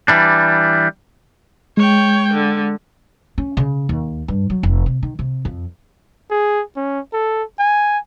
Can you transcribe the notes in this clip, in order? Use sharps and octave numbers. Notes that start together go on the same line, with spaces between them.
E3 G3 D4
G#3 C#5 G5
D3
C#4
C#3
D#2
G2
F#3
F1
C3
D#3
C3
F2
G#4
C#4
A4
G#5